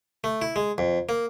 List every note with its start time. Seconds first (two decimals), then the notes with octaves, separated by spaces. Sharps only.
0.24 A3
0.42 E4
0.56 G#3
0.78 F2
1.09 A#3